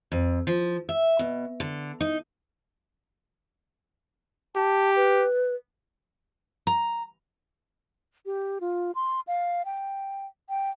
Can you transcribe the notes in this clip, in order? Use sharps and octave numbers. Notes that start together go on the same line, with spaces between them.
F2
F3
E5
B2
D3
D#4
G4 A5
B4
A#5
G4
F4
C6
F5
G5
G5